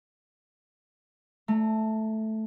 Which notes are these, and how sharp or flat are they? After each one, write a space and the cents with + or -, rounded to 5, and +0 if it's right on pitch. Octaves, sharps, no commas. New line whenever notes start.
A3 -5 A#5 -35